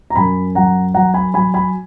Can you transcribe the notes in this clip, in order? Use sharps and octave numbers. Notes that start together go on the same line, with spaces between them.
A#5
F#2 G#5 B5
F#3 F#5 A#5
F#3 F#5 A#5
G#5 B5
F#3 G#5 B5
G#5 B5